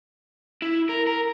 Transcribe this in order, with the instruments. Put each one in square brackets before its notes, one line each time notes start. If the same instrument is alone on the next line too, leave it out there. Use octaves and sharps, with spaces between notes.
[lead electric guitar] E4
A#4
A#4